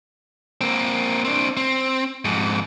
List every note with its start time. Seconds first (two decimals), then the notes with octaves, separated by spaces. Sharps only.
0.61 A#3 C4
1.25 C4 D4
1.57 C4
2.25 F2 G#2